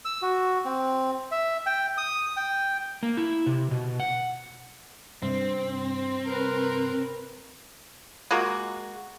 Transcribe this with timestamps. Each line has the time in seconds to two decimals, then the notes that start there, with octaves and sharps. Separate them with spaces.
0.05 E6
0.22 F#4
0.65 C4
1.31 E5
1.66 G5
1.98 D#6
2.37 G5
3.03 A#3
3.17 E4
3.46 C3
3.71 B2
4.00 F#5
5.22 G2 C3 C4
6.25 A#4 B4
8.31 G#3 A#3 F4 F#4